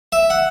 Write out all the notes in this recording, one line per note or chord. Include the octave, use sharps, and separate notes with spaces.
E5
F#5